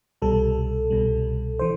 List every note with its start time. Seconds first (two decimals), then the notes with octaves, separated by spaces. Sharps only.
0.22 C2 B2 G3 A4
0.90 C2 B2 G3
1.59 E3 C5